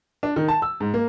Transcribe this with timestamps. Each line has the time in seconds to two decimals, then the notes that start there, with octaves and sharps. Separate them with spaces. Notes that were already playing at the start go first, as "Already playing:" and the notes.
0.23 D4
0.36 D#3
0.48 A5
0.62 E6
0.80 G#2
0.94 A#3